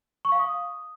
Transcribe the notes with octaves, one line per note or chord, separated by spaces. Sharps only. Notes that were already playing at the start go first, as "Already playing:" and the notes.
C#6
F5
D#6